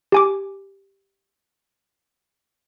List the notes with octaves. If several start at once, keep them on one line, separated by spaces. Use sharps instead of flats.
G4 G#5 D6